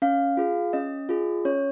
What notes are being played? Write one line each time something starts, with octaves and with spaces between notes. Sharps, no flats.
C#4 F5
F4 G#4
C#4 D#5
F4 G#4
C#4 C#5